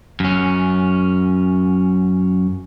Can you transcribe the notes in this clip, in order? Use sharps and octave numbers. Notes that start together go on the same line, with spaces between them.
F#2 C#4